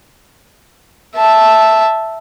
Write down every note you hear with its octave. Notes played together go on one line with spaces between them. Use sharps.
E5 A5